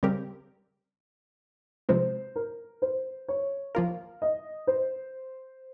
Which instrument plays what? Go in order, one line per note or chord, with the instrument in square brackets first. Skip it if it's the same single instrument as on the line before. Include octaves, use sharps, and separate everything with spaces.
[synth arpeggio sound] C#3 G3 C4 G4 A#4
[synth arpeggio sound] C3 F3 G#3 C4 [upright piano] C5
[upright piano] A#4
C5
C#5
[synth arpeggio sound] F3 A#3 F4 A#4 [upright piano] F5
[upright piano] D#5
C5